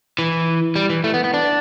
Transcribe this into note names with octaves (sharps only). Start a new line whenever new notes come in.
E3
G3
E3
A3
B3
B3
D4